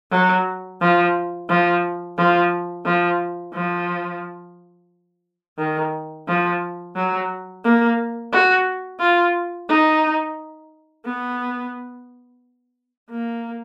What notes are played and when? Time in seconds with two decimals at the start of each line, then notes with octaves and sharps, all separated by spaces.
0.11 F#3
0.81 F3
1.49 F3
2.18 F3
2.85 F3
3.54 F3
5.58 D#3
6.28 F3
6.96 F#3
7.64 A#3
8.33 F#4
9.00 F4
9.69 D#4
11.05 B3
13.10 A#3